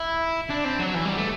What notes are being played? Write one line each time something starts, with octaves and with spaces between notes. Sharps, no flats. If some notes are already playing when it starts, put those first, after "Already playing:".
Already playing: E4
D4
C4
F#3
E3
G3
A3